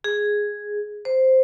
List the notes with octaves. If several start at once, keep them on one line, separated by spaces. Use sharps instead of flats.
G#4
C5